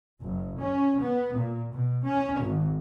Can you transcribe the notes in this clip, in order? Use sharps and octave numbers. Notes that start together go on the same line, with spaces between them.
F#1
C#4
B3
A#2
B2
C#4
G#1